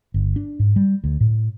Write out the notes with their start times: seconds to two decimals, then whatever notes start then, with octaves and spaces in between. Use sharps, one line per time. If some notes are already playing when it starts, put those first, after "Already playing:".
0.14 G1
0.36 D4
0.59 G#2
0.76 G3
1.04 D2
1.21 A2